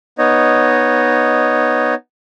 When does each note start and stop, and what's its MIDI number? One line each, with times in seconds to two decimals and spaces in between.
0.18 1.94 59
0.18 1.94 63
0.18 1.94 73
0.18 1.94 75